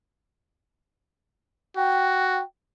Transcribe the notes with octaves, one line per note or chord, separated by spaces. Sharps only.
F#4 G5